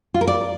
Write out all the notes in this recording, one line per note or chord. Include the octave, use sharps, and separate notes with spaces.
F4
A#4
D5